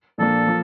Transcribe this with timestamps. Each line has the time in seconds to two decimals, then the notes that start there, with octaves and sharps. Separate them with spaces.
0.18 A#2 F3 A#3 D4 A4
0.47 F3 A#3